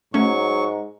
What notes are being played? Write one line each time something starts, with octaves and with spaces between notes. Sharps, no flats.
G#2 F#3 A3 C#4 C#6